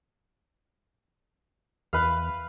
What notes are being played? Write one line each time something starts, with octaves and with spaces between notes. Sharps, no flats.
E2 B4 F5